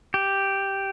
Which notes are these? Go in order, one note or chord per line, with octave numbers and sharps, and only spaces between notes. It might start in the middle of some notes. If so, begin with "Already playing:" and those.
G4